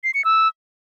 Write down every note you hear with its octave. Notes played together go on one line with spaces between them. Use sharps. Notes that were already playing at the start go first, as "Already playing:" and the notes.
C7
C#7
E6